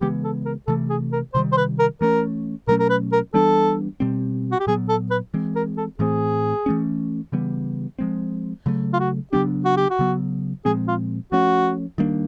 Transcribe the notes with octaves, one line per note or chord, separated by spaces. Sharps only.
C#3 E3 G#3 B3 G4
A4
A#4
C3 E3 A3 A4
G#4
A#4
C3 D#3 G3 C5
C5
B4
A#4
E3 A3 C#4 A#4
B2 F#3 A3 C#4 A#4
A#4
B4
A#4
E3 G3 B3 D4 A4
B2 G3 C4
F#4
G4
A#2 F#3 B3 G#4
A4
B4
E3 G#3 C4
A#4
A4
A2 E3 A3 C4 G#4
E3 A3 C#4
C#3 E3 G3 B3
F3 G#3 C4
C#3 F#3 A3
F4
F#4
C#3 F#3 B3 D4 G4
F#4
G4
F#4
C#3 F#3 B3
A#2 F3 G#3 C4 G#4
F4
F3 A3 C#4 F#4
D#3 G3 A#3 D4